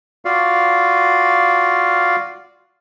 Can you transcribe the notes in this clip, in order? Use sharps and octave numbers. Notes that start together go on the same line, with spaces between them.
F4 F#4 D5 F5